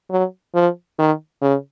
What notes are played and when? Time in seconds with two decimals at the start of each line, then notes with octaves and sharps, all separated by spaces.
0.11 F#3
0.55 F3
0.99 D#3
1.42 C#3